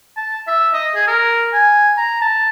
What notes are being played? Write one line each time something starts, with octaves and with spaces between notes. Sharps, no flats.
A5
E5
D#5
G#4
A#4
G#5
A#5
A5